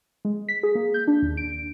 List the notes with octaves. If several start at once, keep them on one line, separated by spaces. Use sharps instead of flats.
G#3
B6
G#4
A#3
G6
D4
D#2
D7